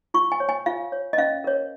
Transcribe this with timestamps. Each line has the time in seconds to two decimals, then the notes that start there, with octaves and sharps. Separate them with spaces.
0.14 F4 C#6
0.32 G#5
0.40 C#5
0.49 G#5
0.66 F4 F5
0.92 C#5
1.13 D#5
1.18 C#4 F5
1.44 A#4 C#5